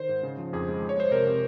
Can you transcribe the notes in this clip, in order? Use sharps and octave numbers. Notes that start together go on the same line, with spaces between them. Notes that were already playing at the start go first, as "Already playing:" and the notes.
Already playing: D#3 C5
G#2
C#3
F3
F2 G#4
G#3
F3
C#5
G#3 C5
C3 A#4
C3